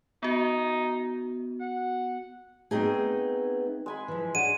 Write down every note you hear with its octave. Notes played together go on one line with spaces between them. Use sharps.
B3 D#4 F#4
F#5
A3 B3 C4 D#4 G#4
G#3 G#5 B5
E3 F3
D4 G#4 C#5 F#5 D#7